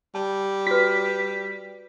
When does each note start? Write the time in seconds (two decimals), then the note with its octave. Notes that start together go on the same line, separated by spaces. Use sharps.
0.15 G3 A5
0.67 F#4 B4 B6